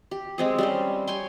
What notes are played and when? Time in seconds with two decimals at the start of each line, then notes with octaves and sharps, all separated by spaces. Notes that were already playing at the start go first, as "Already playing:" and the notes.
0.11 G4
0.38 G#3 C4 G#4
0.58 G3 C#4 C5
1.07 C#5 G5 G#5 C6